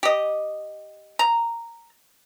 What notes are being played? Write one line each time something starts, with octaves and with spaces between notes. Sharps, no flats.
G4 D#5
A#5